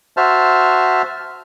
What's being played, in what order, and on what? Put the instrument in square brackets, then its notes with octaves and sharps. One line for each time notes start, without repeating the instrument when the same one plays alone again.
[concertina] F#4 C5 E5 A5 F6